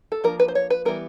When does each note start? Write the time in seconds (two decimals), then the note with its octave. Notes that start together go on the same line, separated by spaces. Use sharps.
0.12 A4
0.24 F3 A#3 D4 A#4
0.40 B4
0.48 C5
0.55 C#5
0.70 B4
0.85 E3 G3 B3 A#4